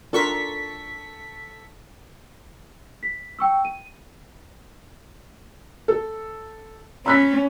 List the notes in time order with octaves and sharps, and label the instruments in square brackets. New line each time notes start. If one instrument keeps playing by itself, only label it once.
[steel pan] D4 F4 A#4 [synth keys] A4 C#6 B6
[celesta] B6
G5 C#6 E6
D#7
[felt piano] A4
[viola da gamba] C#4 [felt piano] B5 F#6 B6